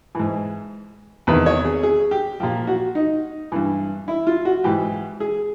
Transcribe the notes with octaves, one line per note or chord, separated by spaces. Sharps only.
G#2 E3
E2 C3 D#3 B4
C#5
G#4
G#4
G4
A#2 F3 G4
F#4
D#4
G2 E3
E4
F4
F#4
G#2 E3 G4
G#4